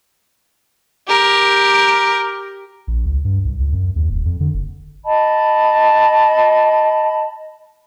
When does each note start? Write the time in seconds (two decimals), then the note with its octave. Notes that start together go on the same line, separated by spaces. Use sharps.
1.08 G4 A#4
2.87 A#1
3.06 C#2
3.25 G2
3.45 C2
3.59 C#2
3.72 F#2
3.96 D#2
4.10 D#1
4.25 F2
4.40 D3
4.54 F#1
5.05 D#5 A5 B5